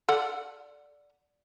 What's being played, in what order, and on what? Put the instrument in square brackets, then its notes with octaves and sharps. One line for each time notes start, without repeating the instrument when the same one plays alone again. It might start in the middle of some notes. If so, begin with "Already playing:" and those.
[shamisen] A4 D5 F#5